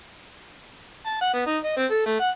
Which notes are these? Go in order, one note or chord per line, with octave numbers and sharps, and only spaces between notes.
A5
F#5
B3
D#4
D#5
C4
A4
A3
F#5